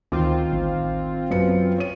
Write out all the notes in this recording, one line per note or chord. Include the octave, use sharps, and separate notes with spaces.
D2 D#3 C4 F4 D6
A1
F#2 B4 C#7
C#5 D#7